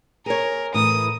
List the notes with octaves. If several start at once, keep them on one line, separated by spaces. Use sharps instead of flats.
G#4 A#4 C#5
A2 E3 D#6